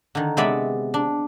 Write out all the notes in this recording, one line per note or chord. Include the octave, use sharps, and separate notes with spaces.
D3 D#3
C3 G#3 B3 D5 E5 B5
D4